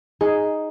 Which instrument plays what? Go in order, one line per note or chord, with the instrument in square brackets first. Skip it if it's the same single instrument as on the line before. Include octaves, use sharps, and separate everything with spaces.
[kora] D#4 [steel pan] G#4